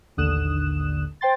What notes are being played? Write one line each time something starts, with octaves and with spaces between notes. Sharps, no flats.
A1 D#2 D3 D#6 F#6 E7
C5 G5 C6 A6